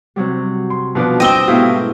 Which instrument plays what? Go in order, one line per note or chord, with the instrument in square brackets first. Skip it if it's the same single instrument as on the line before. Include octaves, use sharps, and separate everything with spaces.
[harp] C3 F#3 G3
[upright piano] C6
[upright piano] B2 F3 B3 [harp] D4 C5 D5
[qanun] C4 D#5 [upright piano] G5 G7
[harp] G#2 B2 A3 [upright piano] E4 G4 F5